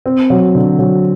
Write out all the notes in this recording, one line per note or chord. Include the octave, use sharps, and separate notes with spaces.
C4
F#3
D3
F#3